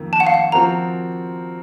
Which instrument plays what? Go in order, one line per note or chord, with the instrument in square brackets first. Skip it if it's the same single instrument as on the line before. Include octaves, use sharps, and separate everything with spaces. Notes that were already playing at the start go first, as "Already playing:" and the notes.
Already playing: [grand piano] F2 D#3 A#3
[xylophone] A5
F#5
F5
F#5
[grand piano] F3 C4 F#4 A#4 [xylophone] A#5